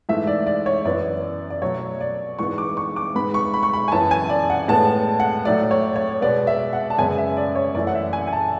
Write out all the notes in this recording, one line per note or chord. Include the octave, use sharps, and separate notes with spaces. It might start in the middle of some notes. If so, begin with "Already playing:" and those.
G#2 E3 A3 E5
D5
D5
C#5
F#2 E3 B3 D5
D5
B2 F#3 A3 C#5
D5
G#2 E3 G#3 B3 C#6
D6
C#6
D6
G#2 G#3 B3 B5
C#6
B5
C#6
B5
G#5
F#2 E3 B3 A5
G#5
D5
F#5
A2 G#3 B3 A5
F#5
A2 F#3 A3 D5
C#5
C#5
B2 G#3 B3 D5
E5
F#5
A5
F#2 C#3 G#3 B3 G#5
E5
D5
C#5
F#2 E3 A3 D5
F#5
E5
G#5
G#5
A5